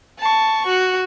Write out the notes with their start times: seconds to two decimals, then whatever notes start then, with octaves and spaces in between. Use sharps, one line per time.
0.20 A5 C#6
0.66 F#4